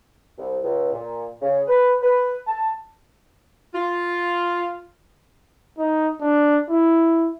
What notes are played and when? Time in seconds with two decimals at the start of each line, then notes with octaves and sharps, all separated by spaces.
0.38 C2
0.63 C#2
0.92 A#2
1.42 C#3
1.68 B4
2.02 B4
2.47 A5
3.75 F4
5.78 D#4
6.21 D4
6.70 E4